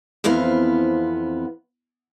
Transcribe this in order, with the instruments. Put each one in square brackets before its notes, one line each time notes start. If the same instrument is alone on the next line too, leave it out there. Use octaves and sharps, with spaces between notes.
[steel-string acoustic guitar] F2 E3 B3 C4 F5